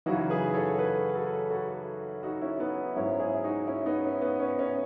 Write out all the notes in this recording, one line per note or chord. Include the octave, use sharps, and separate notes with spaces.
F#2 C#3 E3 D#4 F#4
G#4 B4
A4 C#5
G#4 B4
F#4 A4
F#4 A4
D#4 F#4
C#4 E4
B3 D#4
G#2 F#3 C#4 E4
E4 G#4
D#4 F#4
C#4 E4
B3 D#4
C#4
B3
C#4
C#4